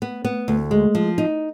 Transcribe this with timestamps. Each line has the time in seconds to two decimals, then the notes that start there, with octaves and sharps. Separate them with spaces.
0.02 B3
0.25 B3
0.48 D2
0.71 G#3
0.95 F3
1.18 D#4